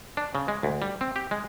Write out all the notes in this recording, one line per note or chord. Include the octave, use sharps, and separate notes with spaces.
D4
C#3
G#3
D2
G3
C4
G4
G#3